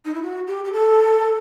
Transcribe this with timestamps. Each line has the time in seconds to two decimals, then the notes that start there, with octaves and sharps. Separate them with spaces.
0.05 D#4
0.14 E4
0.22 F#4
0.47 G4
0.64 G4
0.72 A4